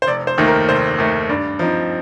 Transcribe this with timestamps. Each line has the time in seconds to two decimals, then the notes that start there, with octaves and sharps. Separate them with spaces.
0.02 C5
0.07 F1 D5
0.27 C5
0.38 D#2 D#3 A3
0.48 A#4
0.69 F1 C5
0.98 D#2 D#3 A3
1.29 G2 D5
1.59 F3 C4 D#4